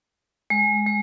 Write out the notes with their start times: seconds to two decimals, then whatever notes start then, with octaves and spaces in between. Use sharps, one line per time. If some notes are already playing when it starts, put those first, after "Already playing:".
0.50 G#3
0.87 G#3